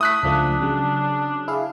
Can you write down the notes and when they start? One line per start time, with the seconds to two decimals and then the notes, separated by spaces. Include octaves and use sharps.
0.01 A3 E4 D#6 F#6 B6
0.23 C#2 F3 A3 D4
0.61 C#3 F#3
1.48 E4 G#4 F5